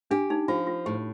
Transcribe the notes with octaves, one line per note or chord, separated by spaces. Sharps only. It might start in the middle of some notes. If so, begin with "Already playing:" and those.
D4 G4
D#4
F3 F4
F4
A2 G4